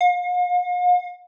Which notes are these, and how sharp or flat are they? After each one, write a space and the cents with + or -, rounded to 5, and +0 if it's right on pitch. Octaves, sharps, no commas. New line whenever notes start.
F5 +45